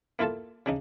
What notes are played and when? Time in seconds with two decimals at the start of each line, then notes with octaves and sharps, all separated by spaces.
0.19 A#3 E4 F4 A4 A5
0.66 C#3 D4 D#4